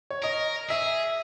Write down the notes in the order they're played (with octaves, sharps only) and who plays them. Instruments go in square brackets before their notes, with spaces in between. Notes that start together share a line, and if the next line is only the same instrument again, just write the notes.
[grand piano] C#5
[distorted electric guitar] A#4 [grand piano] D#5
[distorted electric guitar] G#4 [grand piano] E5